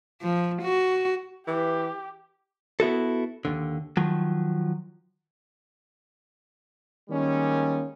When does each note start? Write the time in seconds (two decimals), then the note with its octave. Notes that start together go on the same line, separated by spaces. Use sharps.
0.21 F3
0.63 F#4
1.47 E3 G4
2.80 B3 E4 F#4 A4
3.45 D#2 D3
3.97 D#3 F3 F#3
7.10 D#3 G3 G#3 A#3 C#4